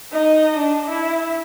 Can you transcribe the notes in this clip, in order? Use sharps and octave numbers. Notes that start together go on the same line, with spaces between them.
D#4 D#5
D4
E4